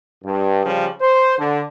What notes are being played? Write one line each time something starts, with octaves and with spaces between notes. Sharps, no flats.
G2
C#3 F3 G3
C5
D3